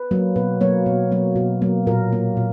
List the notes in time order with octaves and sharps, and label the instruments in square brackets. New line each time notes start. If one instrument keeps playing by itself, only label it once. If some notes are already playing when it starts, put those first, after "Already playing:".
Already playing: [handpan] B4
F#3 A#3
B2 B4
F#3 A#3 C#5
B2
F#3 A#3
B2
F#3 A#3
A#2 A#4
A#3
A#2